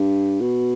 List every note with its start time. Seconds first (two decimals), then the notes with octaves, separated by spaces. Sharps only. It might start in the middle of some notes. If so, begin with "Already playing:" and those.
Already playing: G2
0.41 B2